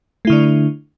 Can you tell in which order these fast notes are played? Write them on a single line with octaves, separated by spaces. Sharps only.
A3 E4 D3 D4